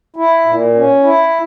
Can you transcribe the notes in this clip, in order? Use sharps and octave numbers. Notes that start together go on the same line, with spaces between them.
E4
A#2
C#4
E4